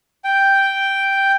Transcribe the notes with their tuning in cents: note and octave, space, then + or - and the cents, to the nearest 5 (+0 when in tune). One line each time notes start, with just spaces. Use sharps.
G5 +0